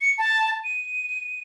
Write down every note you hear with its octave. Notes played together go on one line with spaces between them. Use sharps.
C#7
A5
D#7